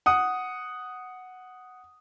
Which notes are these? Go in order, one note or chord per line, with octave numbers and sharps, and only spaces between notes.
F#5 D#6